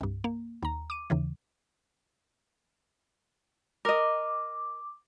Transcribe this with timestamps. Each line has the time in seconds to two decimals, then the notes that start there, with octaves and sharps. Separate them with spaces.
0.01 C2 G2
0.24 A#3
0.63 D#2 A#5
0.90 D6 D#7
1.10 D#2 C#3 E3
3.85 A#4 D#5 D6